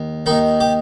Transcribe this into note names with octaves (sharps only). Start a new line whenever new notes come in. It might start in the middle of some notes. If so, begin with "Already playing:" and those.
Already playing: D#2
D#2 D#3 D#4
G4